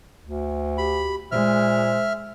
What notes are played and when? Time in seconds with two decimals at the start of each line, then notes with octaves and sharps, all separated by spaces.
0.24 D2
0.78 G4 B5
1.32 A#2 G#3 C5 E5 F6